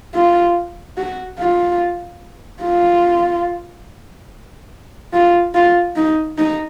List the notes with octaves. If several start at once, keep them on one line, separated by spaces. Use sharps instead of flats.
F4
F#4
F4
F4
F4
F4
D#4
D#4